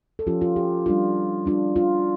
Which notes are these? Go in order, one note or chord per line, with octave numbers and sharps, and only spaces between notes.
A4
F3 C#4 F4 G4
F4
G4
G3 D4 F4
G3 D4 F4
F4